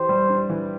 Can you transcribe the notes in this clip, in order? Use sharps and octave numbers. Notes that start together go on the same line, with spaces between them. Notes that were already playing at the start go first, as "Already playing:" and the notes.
Already playing: E3 G4 C5
G3
D4
E3